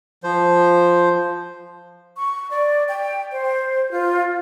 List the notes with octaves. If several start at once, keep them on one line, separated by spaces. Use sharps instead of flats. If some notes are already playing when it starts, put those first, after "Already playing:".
F3 C5
C#6
D5
G5
C5
F4